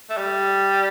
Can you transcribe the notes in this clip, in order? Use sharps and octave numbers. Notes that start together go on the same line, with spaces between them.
A3
G3